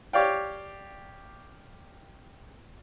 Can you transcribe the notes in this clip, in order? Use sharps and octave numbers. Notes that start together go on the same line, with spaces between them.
G4 C#5 D5 F5 G5